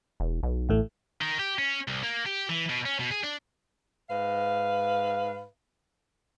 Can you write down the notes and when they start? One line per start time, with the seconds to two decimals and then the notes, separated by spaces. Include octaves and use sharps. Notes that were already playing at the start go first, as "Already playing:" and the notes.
0.20 E1
0.43 B1
0.69 A1 A2 A3
1.21 D#3
1.39 G4
1.59 C#4
1.88 C2
2.03 A#3
2.26 G4
2.49 E3
2.69 B2
2.86 C#4
3.00 B2
3.11 G#4
3.23 D4
4.08 G#2 B4 F5